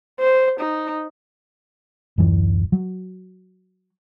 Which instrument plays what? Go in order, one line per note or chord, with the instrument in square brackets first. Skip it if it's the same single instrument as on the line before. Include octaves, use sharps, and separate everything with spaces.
[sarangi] C5
D#4
[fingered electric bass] D1 F#2 E3
F#3